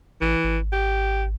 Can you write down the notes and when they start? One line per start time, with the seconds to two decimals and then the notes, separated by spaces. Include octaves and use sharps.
0.22 A1 E3
0.44 G#1
0.73 G4